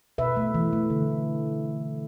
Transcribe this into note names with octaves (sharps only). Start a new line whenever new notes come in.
B2 B4 E5
A3
E3
A3
D3